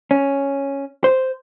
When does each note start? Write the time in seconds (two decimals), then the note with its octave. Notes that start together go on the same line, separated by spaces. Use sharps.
0.11 C#4
1.04 C5